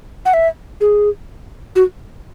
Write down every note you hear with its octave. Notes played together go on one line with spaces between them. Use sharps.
F#5
E5
G#4
F#4